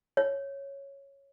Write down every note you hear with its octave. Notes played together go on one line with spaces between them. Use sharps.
C#5